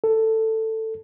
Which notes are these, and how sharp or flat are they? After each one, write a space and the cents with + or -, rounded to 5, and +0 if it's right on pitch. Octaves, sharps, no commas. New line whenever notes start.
A4 +10